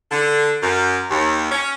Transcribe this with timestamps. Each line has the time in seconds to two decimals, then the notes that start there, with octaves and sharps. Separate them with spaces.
0.11 D3
0.62 F#2
1.10 D#2
1.51 C#4